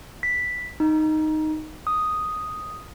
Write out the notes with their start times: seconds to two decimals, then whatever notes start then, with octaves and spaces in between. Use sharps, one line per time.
0.23 B6
0.80 D#4
1.87 D#6